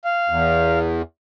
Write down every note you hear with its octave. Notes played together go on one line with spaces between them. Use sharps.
F5
E2